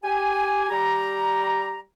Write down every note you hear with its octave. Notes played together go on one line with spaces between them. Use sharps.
G4 G#5
G3 G4 A#5